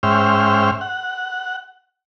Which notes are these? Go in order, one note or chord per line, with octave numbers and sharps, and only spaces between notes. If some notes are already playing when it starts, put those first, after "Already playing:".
G#2 C#4 C5 E5 G5 F6
F#5